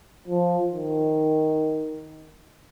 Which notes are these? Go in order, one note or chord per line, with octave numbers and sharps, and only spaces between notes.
F3
D#3